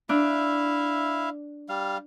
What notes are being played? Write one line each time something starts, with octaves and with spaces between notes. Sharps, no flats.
D4 E4 E5 F5
G3 F5